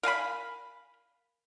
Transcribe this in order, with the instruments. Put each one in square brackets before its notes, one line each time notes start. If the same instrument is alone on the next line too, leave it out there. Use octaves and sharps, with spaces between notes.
[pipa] A#4 F5 G#5 B5